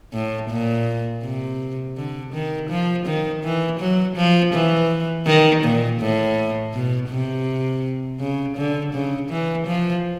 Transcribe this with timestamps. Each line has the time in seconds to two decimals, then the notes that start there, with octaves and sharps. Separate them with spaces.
0.13 A2
0.50 A#2
1.23 C3
1.97 D3
2.33 D#3
2.69 F3
3.06 D#3
3.43 E3
3.80 F#3
4.16 F3
4.53 E3
5.26 D#3
5.63 A#2
5.99 A2
6.73 B2
7.10 C3
8.20 C#3
8.57 D3
8.93 C#3
9.29 E3
9.67 F3